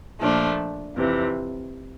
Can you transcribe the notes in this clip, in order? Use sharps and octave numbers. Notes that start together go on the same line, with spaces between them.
A#2 F3 A3 D4
F2 C3 E3